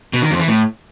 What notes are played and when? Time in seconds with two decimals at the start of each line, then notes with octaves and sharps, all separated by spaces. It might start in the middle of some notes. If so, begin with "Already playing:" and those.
0.13 B2
0.22 D#3
0.31 F2
0.40 E3
0.48 A2